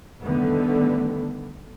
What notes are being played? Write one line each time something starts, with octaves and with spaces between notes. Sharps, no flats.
D3 D#3 G3 A3 B3